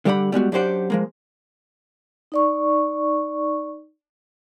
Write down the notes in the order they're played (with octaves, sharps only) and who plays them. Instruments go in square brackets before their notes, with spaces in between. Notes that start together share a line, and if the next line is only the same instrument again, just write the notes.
[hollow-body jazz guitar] D3 G3 G4 E5 F#5 B5
G3 G#3 B3 F#4
F#2 D4 G4 C5 F#5
F3 G#3 A#3
[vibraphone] D#4 D5 C#6